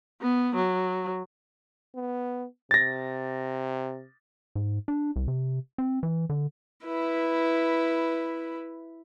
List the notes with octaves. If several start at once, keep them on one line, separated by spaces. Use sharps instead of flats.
B3
F#3
B3
C3 A6 A#6
G#2
D4
C2
C3
C4
E3
D3
E4 B4